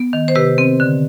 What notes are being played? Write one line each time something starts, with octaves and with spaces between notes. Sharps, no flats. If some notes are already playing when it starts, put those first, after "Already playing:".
Already playing: B3
D#3
C5
C3 G4 B4
C4
D3